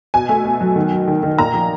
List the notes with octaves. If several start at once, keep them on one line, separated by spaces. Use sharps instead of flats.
B2 G#5
A3
B2
F#3
D#3
F#3
D#3
D#3
A#2 A#5
F3